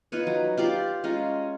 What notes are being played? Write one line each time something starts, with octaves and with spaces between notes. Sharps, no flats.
D#4 F4 B4 C#5
F#3
F4 G4 D5 F5
G#3 C#4 F4 A#5